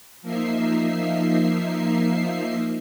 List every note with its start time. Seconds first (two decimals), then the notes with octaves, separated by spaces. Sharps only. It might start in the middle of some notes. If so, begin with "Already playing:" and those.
0.22 F3 A#3 D#4 E5 C7